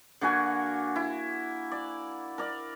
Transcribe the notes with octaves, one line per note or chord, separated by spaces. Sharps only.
D3 A#3 F#4 G#5
E4
D5
A#4 D5